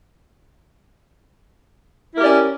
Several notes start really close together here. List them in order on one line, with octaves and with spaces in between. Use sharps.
E4 A#4 G4 D5 C#4